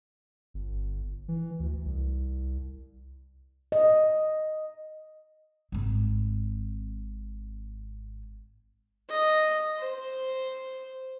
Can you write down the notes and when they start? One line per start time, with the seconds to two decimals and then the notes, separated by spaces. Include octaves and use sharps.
0.54 G1
1.28 E3
1.60 D2
1.85 C2
3.72 D#5
5.72 G#1 C4
9.10 D#5
9.79 C5